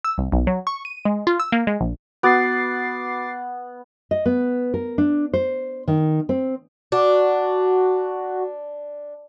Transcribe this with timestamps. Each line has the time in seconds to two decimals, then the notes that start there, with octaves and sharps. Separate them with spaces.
0.05 E6
0.18 C2
0.32 B1
0.47 F#3
0.67 C#6
0.85 D#7
1.05 G#3
1.27 F4
1.40 E6
1.52 A#3
1.67 G#3
1.81 A#1
2.23 B3 F#4 D6 A6 C7
4.11 D#5
4.26 B3
4.74 A#4
4.98 D4
5.33 C5
5.88 D#3
6.29 C4
6.92 D4 F#4